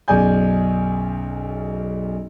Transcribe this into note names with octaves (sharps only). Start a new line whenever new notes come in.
B1 F#2 G#4 D5 G#5 G6